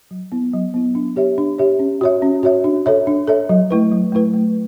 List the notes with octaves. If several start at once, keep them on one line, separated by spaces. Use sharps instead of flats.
F#3
B3 E4
F#3
B3 E4
D4
G4 C#5 E5
D4
G4 C#5 E5
C#4
F#4 C#5 E5
C#4
F#4 C#5 E5
D4
A4 C#5 E5
D4
A4 C#5 E5
F#3
A3 E4 B4
F#3
A3 E4 B4
A3